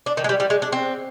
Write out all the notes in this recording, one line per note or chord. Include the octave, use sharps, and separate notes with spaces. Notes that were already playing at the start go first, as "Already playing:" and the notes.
D4
D#3
G#3
G3
G3
G#3
D4
C4